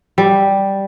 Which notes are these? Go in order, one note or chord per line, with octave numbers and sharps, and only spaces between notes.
G3